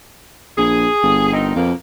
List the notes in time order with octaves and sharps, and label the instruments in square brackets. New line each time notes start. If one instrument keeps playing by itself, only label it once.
[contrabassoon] A#1 [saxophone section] G#4
[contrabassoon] G1
[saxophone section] D#3 C4 D#4
[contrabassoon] F2 [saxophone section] B2 A#3